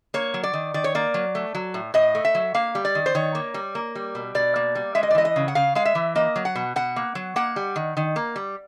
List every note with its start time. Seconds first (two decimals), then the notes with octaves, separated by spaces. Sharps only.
0.14 A#3 C#5
0.34 F#3
0.43 D5
0.53 D#3
0.74 D#3 D5
0.84 C#5
0.95 A#3 D5
1.14 F#3
1.35 A3
1.55 F#3
1.74 A2
1.94 A2 D#5
2.15 A3
2.25 E5
2.35 F#3
2.54 A#3 F5
2.75 G3
2.85 D5
2.95 D#3
3.06 C5
3.15 D#3 C#5
3.35 A#3
3.54 G3
3.75 A#3
3.95 G3
4.15 B2
4.35 B2 D5
4.56 A#3
4.75 G3
4.95 G#3 E5
5.03 D#5
5.11 D5
5.15 E3 D#5
5.25 D#5
5.36 C#3
5.48 F#5
5.55 C#3 F5
5.75 G#3 F5
5.85 E5
5.95 E3
6.15 A#3 D#5
6.36 F#3
6.45 F#5
6.55 B2
6.76 B2 F#5
6.96 A#3
7.15 F#3
7.36 A#3 F#5
7.56 G3
7.76 D#3
7.97 D#3
8.16 A#3
8.36 G3